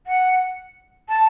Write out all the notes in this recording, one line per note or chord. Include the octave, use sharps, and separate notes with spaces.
F#5
A5